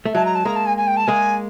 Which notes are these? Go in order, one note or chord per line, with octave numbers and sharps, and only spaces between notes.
A3
F#3 G#3 A5
A#5
A5
G#3 A#3 A#5
A5
G#5
G#5
G5
A5
G#3 A#3 G#5